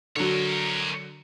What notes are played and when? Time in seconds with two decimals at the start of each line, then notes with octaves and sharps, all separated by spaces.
0.16 D3 F#3 A#4 C#5